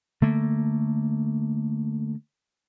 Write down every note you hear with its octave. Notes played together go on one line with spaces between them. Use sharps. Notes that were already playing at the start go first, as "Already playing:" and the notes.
D3 A3 A#3